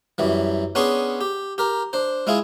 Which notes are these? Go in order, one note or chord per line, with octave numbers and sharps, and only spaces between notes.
F#2 E3 G3
B3 C#4 D4 G#4 C6 C#6
G4
G4 A#4
D4 C5
G#3 E4 F4 G#4